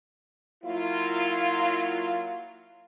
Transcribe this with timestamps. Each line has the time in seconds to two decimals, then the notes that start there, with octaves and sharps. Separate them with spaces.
0.63 F#3 A#3 E4 F4